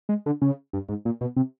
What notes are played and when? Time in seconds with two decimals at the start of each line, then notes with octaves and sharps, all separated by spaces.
0.09 G#3
0.26 D3
0.42 C#3
0.73 G2
0.89 G#2
1.05 A#2
1.21 B2
1.36 C3